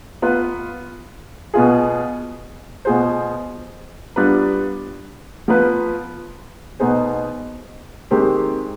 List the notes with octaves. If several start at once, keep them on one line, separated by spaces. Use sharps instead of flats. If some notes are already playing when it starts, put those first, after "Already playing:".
B3 F4 B4
B2 B3 F4 G#4
B2 B3 F4 G#4 C5
G3 B3 D4 F4 B4
F3 B3 F4 B4
B2 B3 D#4 G#4 C5
D#3 G#3 C4 G4 C5